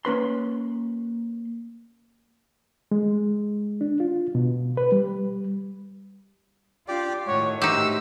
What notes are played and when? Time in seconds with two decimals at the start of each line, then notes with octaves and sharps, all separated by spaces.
0.05 A#3 C#4 B4 C6
2.91 G#3
3.81 D4
4.00 F4
4.35 B2
4.77 B4
4.92 G3
6.88 D4 F4 G4 D5
7.27 A2 D#3 F#4 C#5
7.62 D#4 F#4 G4 C5 E5 E6